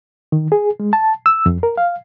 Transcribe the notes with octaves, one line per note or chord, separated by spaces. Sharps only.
D#3
G#4
G#3
A5
E6
F2
A#4
F5